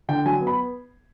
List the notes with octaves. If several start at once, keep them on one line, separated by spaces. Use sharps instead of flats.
D3 G5
F#3 G#5
B3
B5